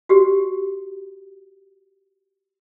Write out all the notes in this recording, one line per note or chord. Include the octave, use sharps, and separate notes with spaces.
F#4 G4